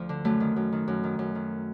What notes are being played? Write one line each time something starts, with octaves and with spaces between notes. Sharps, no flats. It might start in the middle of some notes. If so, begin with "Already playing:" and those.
Already playing: D2 F3
D3
F#2 A3
D#3
F#2
D#3
F#2
D#3
F#2
D#3